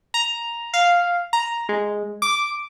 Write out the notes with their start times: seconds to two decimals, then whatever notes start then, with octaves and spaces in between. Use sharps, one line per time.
0.14 A#5
0.74 F5
1.33 A#5
1.69 G#3
2.22 D6